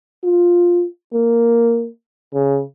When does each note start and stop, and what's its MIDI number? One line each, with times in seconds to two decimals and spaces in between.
0.24 0.85 65
1.13 1.88 58
2.34 2.61 49